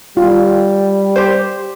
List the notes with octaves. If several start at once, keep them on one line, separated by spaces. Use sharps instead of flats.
G3 F4
G4 C5